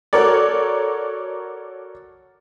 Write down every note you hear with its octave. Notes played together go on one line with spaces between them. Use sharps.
F#4 A4 A#4 C#5 D5